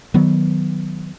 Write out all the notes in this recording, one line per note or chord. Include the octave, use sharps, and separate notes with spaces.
D#3 F#3 B3